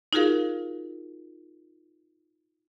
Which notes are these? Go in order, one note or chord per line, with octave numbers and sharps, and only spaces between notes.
D#4 F4 F#4 G#4 A#4 F5